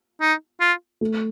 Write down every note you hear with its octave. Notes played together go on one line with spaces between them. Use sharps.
D#4
F4
A3